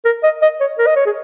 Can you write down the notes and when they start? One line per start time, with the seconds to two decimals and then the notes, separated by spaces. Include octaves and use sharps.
0.05 A#4
0.23 D#5
0.42 D#5
0.60 C#5
0.78 A#4
0.87 D#5
0.96 C#5
1.06 G#4